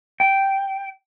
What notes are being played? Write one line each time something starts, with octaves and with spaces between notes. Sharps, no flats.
G5